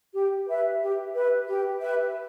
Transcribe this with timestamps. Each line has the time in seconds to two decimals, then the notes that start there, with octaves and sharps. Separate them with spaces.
0.14 G4
0.47 B4 E5
0.80 G4
1.14 B4 E5
1.48 G4
1.81 B4 E5